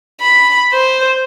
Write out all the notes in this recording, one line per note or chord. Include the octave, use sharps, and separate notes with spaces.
B5
C5